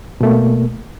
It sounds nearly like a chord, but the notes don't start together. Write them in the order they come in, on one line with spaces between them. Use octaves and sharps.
B2 A3 A#3